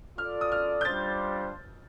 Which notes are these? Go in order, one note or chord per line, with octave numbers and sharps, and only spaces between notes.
F4 A4 D5 F6
D#6
F6
G6
G3 D4 F4 C5 A6